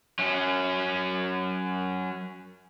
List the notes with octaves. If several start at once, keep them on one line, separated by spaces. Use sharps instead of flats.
F#3 C#4